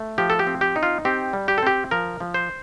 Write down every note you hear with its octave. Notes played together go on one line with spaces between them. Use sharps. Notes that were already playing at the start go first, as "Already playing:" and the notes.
Already playing: A3
F3 G4
A4
G4
C4
G4
D#4
F4
C4 G4
G3
G4
A4
C4 G4
F3 A#4
F3
C5